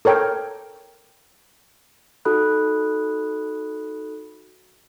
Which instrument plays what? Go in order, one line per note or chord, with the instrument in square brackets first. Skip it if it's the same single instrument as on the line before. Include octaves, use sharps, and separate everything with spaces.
[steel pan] A4 A#4 C#5 G5
[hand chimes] D#4 F#4 A4 B5 D#6 F#6